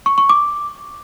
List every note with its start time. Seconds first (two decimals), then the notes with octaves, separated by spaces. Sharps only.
0.06 C#6
0.18 C#6
0.29 D6